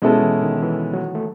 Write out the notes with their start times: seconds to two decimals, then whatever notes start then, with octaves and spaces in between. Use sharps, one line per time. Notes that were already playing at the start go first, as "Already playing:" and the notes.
0.02 B2 G#3 C#4 E4 A4
0.22 E3
0.42 D#3
0.63 E3
0.94 F#3
1.15 A3